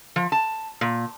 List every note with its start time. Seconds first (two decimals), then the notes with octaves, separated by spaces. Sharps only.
0.16 F3
0.32 A5
0.81 A#2